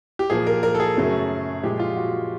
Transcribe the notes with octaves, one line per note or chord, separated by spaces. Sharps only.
G4
A#2 F3 A#3 G#4
A#4
A#4
A4
G#4
F#2 C#3 F#3 A3
A#2 F3 G#3 G4
F4
F#4